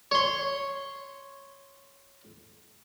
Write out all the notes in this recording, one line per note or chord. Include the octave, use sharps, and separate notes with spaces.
C#5 C6